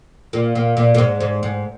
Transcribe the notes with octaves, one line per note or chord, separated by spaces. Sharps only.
A#2
A#2
A#2
A#2
G#2
G#2
G#2